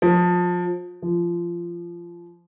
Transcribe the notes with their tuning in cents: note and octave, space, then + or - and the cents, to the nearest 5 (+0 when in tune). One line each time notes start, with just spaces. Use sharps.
F3 +25
F3 -20